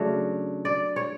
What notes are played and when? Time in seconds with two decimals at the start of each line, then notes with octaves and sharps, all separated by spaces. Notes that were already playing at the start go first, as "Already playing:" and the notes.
Already playing: C#3 F#3 A3 D4
0.65 D5
0.96 C#5